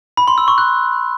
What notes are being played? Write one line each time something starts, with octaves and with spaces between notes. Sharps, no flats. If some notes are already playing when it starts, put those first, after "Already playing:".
B5
C6
E6
C#6
F#6